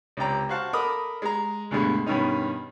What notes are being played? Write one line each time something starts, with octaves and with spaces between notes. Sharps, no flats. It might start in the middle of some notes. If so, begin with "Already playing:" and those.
C#2 C3 D5 G5 A#5
F#4 C5 F5 F#5 A5
A4 A#4 D#5 B5 D6 D#6
G#3 A#5
D2 G2 B2 D3 G#3
G2 B2 D#3 C#4 D#4